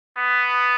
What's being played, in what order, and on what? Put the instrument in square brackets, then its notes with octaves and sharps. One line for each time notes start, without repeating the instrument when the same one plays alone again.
[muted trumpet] B3